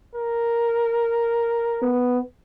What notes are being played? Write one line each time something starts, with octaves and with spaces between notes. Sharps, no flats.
A#4
B3